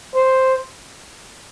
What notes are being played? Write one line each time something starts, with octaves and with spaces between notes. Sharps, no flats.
C5